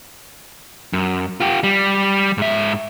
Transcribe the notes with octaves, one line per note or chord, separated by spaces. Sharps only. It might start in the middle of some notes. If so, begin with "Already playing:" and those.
F#2
F4 G4
G3
G#2 E5